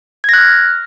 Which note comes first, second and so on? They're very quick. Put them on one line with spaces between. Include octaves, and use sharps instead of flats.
G#6 A#6 F#6 F6